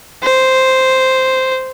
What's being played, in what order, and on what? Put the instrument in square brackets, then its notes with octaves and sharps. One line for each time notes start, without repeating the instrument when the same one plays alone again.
[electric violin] C5